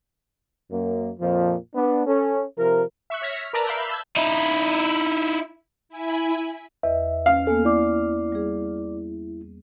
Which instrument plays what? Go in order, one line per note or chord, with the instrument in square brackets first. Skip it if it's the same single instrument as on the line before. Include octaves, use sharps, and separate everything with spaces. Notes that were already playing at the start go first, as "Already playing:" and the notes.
[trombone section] F#2 A#3
F2 A#2 F3
B3 D4
C#4 A4
C3 F3 A#4
[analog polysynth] E5 C#6 F#6
C#5 E5 F6 G#6 A#6 B6
F6
A#4 B4 D5 A5 A#5 E6
E5 F5 B5 E6 F#6 G6
A5 B5 E6 G6 G#6
[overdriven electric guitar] D#4 E4
[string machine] E4 G#5 B5
[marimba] E2 D#5 [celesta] B4 [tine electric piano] E5
[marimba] C#4 [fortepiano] F5
[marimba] A#3 B3 G#5 [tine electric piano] A4
[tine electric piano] E4 [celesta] D5 D6
[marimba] G3 G#4